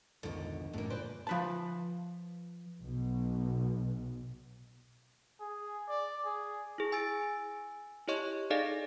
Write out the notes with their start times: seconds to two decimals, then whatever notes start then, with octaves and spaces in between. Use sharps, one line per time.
0.23 B1 F2 G#2 D3 D#3
0.74 A1 F#2 A2 A#3
0.90 A#2 D3 G#3 B4 C5 D5
1.27 F3 B4 A5
2.81 B1 B2
5.41 G#4
5.89 D5
6.26 G#4
6.78 E4 G#4
6.92 G#5 E6 A6 D7
8.08 E4 G4 C#5 D#5 C#6
8.50 D#4 G#4 A4 D5 D#5 F5